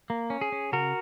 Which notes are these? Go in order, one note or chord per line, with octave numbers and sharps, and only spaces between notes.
A#3
C#4
G#4
C#4
C#3 F#4 A#4